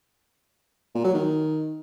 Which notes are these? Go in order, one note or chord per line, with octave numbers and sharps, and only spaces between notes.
A#2
F#3
D#3